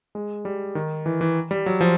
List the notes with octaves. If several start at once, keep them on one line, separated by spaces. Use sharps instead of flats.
G#3
G3
D#3
E3
E3
G3
F#3
F3